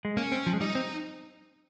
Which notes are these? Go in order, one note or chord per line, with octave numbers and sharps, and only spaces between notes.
G#3
A#3 C#4
C4
F3
G#3
G3 D#4
C4